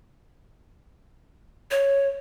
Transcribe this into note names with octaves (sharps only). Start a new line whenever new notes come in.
C#5